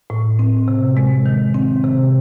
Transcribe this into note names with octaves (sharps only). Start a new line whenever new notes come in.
A2
C4
C3
G#3
D#3
C4
C3